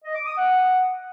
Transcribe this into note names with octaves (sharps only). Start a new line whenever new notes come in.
D#5
D6
D#6
F#5